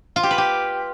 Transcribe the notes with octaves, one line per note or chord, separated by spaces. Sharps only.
F4
G4
B4
G4